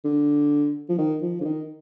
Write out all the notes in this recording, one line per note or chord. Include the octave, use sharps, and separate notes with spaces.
D3
F3
D#3
F3
D3
D#3